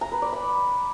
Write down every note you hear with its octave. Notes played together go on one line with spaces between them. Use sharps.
A#5
B4
D5
B5